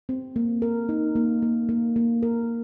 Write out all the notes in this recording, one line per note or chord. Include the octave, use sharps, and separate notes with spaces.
C4
A#3
A#4
D#4
A#3
A#3
A#3
A#3
A#4